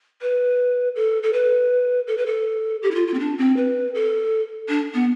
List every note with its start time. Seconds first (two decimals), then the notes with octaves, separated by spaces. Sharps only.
0.21 B4
0.96 A4
1.23 A4
1.33 B4
2.07 A4
2.18 B4
2.26 A4
2.83 G4
2.91 E4
2.95 F4
3.07 F4
3.14 C4
3.19 D4
3.38 C4
3.57 B4
3.95 A4
4.69 D4
4.94 B3